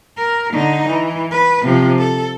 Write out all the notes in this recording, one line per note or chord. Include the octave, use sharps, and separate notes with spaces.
A#4
D3 D#4
E3
B4
C3 F3
A4